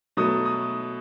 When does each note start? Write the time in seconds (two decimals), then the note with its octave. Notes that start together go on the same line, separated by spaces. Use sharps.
0.17 B2 F#3 A3 D#6
0.45 D#6